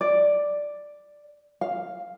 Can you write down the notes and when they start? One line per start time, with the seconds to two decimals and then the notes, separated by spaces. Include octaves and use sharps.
0.01 D5
1.61 F5